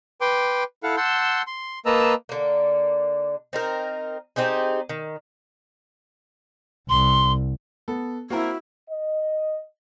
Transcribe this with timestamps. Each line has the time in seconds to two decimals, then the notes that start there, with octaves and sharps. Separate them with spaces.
0.21 B4 G5 C6 D6
0.83 E4 A4 F5 F#5
0.97 F#5 A5 C6 E6 G6
1.47 C6
1.86 A#3 B4 D#5 A5 A#5 E6
2.29 D3 A#3
3.53 C4 D#4 A#4
4.36 C4 D#4 G4 G#4
4.89 D#3
6.89 C2 C6
7.88 B3 A4
8.30 A#3 C4 E4 F#4 A#4
8.88 D#5